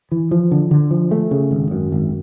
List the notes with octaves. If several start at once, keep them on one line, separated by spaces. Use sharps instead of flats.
E3
F3
D3
D3
F3
A3
C#3
G#1
F#2
G#1